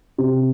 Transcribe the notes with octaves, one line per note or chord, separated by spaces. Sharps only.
C3